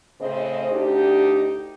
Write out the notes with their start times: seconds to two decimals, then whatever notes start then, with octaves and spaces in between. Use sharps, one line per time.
0.20 A2 C#3 C4 C5 D#5
0.70 D2 D4 D#4 G4